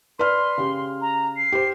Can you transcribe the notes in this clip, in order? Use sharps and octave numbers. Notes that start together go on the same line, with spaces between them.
B4 D5 C6 F6
C#3 G4
A#5
C7
G4 C5